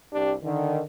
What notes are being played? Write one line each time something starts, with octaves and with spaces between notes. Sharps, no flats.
C2 D4 G4
D3 D#3